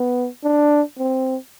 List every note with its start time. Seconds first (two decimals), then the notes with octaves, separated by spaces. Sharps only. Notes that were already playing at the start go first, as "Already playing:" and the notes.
Already playing: B3
0.44 D4
0.98 C4